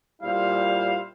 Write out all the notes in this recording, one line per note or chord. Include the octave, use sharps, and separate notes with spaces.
A#2 G3 E4 C5 F5